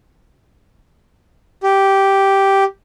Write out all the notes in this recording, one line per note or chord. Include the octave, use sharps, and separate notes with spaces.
G4